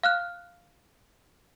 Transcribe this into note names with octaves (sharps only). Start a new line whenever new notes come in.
F5 F6 F#6